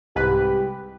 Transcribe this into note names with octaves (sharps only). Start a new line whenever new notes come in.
C2 G#2 G4 B4